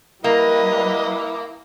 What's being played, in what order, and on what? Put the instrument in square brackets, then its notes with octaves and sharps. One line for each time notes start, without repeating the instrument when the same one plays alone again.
[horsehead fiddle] G3 B4 [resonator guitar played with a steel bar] A#3 [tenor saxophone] E4 [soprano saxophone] D#5